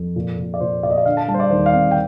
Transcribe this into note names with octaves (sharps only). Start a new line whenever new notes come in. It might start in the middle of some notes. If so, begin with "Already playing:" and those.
Already playing: F2
A#2
A#2
D5
A#2 C5
A#2 D5
D#5
D5
D3 F5
A5
G3 A5
C5
D5
D#2 C5
F5
C4
G5